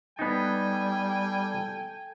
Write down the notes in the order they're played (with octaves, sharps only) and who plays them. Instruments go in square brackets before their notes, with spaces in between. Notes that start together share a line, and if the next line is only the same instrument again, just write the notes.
[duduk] G3 [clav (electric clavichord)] B3 D#4 [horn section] A4 G5 G#5